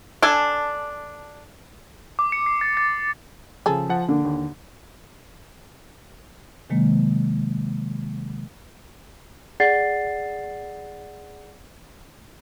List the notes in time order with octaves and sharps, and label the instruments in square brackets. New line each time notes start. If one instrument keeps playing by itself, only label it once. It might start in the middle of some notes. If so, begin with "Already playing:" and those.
[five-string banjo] D4 A4 G#5
[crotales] D6
C#7
C7
A6
A6
[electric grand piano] C#3 F3 [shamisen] G#4 A4
[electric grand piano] F3 F#5 A5
[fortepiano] D3 [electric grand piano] A#3
[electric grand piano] D#2
[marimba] C3 D#3 F#3 G#3 A#3
[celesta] G#4 D5 F#5 A6 C7